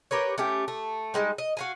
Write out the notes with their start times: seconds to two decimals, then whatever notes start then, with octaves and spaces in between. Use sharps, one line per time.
0.11 G4 A#4 B4 C#5
0.38 A3 C#4 G4 G5
0.68 A3
1.14 G3 G#3 A#3 D#4
1.38 D#5
1.57 F#4 F5 G#5